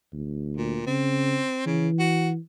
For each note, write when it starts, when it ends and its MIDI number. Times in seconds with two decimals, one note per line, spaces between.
0.13 0.81 38
0.57 0.83 46
0.87 1.40 49
0.87 1.62 60
1.66 1.89 49
1.66 2.38 52
1.99 2.29 66